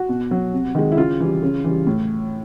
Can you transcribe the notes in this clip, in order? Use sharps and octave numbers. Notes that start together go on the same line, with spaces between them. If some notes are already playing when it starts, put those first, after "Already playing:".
Already playing: F#4
B2
F#3
C3
D#3 G#3
E4
C#3 F4
E3 G3
C#3
E3 G3
A2